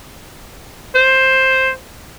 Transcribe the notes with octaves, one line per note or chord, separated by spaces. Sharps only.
C5